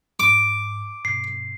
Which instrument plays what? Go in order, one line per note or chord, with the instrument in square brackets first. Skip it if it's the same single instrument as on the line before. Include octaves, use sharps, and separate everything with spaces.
[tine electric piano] G#2 [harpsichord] D6
[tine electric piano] G2 B2 [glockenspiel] C7